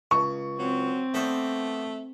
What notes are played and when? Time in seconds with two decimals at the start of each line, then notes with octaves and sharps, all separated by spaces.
0.11 C#2 C#6
0.59 F#3 C4
1.14 A3 B3 C5 D5